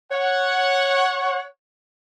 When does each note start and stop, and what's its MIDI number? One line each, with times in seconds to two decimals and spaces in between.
0.12 1.41 73
0.12 1.41 78